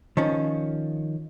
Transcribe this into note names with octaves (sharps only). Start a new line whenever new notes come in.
D#3 F3 C#4